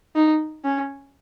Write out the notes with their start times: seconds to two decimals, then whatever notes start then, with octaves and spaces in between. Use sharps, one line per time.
0.15 D#4
0.64 C#4